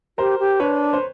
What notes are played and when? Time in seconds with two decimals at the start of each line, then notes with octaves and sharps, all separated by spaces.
0.18 G4 A#4 C5
0.39 G4
0.60 D4 B4 C#5
0.93 C5